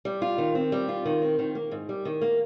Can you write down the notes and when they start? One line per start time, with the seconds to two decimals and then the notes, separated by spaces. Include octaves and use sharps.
0.05 G3
0.22 F4
0.38 D#3
0.55 C4
0.72 G3
0.89 F4
1.05 D#3
1.22 C4
1.39 D#3
1.55 A#3
1.71 G#2
1.89 G3
2.05 D#3
2.21 A#3